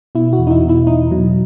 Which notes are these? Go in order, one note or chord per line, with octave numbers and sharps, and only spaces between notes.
B2 E4
F#4
E2
D#4
E4
B2
E4
E2 D#4
B2 F#3